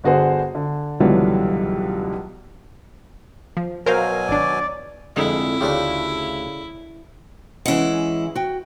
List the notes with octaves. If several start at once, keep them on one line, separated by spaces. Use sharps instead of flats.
G1 D3 F#4 G#4 C5
D3
C#2 B2 D3 E3 F#3 G3
F3
B2 F#3 A#4 C5 F5 G#5
G#1 D4 D5
C2 F2 D3 G#3 E4 G#4
D2 C#3 A3 D4 F4 G4
E3 G#3 C#4 E4 F#5
F#4 G5